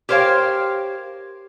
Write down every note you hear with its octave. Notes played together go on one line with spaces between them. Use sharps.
G4 A#4 C5 C#5 F5 G5